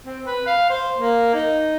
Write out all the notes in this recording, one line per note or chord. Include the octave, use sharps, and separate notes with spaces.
C4
B4
F5
C5
A#3
D#4